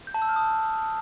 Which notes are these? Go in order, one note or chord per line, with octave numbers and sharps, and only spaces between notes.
G6
A5
E6
F6
D#6